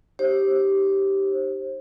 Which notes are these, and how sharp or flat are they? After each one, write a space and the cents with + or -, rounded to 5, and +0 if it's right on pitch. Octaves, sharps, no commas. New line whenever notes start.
D#4 +0 G4 -5 C5 +30